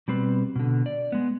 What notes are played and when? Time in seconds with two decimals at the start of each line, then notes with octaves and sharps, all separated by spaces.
0.08 B2 G3 C4 B4
0.56 B2 D3
0.86 D5
1.12 G#3 B3